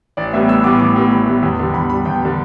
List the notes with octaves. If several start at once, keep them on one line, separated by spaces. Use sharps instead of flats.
A1 D5
A2 G3 B3 E5
A1 E6
A2 G3 B3 D6
A1 D6
A2 G3 B3
A1 B5
A2 G3 B3
E2
D3 G3
E2 B5
D3 G3 B5
E2 G5
D3 G3